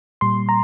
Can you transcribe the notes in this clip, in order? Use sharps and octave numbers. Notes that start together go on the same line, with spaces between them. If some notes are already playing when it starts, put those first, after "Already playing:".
A#2 G3 C6
A#5